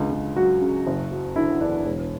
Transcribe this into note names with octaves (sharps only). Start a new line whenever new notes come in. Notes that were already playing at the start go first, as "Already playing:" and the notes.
Already playing: C#2 D3
C#2
F#3 F#4
C#3
F#1
F#3
D3 E4
E2 D4
E1